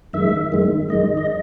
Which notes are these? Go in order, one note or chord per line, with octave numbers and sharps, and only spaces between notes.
F#2 D#3 G#3 E5
F#2 D#3 G#3
F#2 D#3 G#3 D#5
D#5